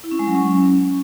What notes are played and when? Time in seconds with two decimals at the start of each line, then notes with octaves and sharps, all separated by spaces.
0.04 E4
0.11 C#4
0.19 G#3
0.27 F#3
0.35 C#4